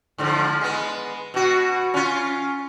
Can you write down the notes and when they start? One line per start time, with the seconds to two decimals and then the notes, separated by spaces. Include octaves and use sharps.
0.18 G#2 D3 F3
0.61 G#3 B3
1.34 B2 F#4
1.94 C#4 F4